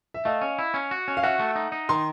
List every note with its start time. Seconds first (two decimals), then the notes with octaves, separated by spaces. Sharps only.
0.14 E5
0.25 A3 D#5 F5
0.42 C#4
0.58 E4
0.74 C#4
0.91 F#4
1.08 C#4
1.17 F5
1.23 F#4 E5 F#5
1.40 A3
1.56 D#4
1.72 D#4
1.89 D#3 A#5 C6